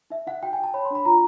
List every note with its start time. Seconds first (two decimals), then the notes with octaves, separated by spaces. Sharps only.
0.10 D#4 E5
0.27 D#4 F#5
0.43 F#4 G5
0.53 G#5
0.59 F#4 A5
0.74 C#5 B5
0.85 C6
0.91 D4 B5
1.05 F4 A#5